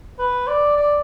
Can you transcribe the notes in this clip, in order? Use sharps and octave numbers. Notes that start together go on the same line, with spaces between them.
B4
D5
D5